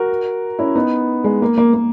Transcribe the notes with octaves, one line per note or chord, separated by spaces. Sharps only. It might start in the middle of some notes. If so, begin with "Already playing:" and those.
Already playing: F#4 A#4
C#4 E4
B3 D#4
G#3
A#3
A#3
A#3